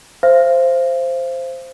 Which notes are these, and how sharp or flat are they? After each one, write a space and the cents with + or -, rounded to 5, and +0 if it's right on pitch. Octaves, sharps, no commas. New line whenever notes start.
C5 +0 F5 -40